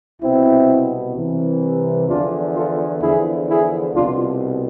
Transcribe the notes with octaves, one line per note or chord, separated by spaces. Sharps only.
C2 B2 C4 E4
C2 C3 E3
E2 D3 F3 D4 F4
F4 A4
E2 D3 F3 E4 G#4
E4 G#4
C2 B2 D4 F4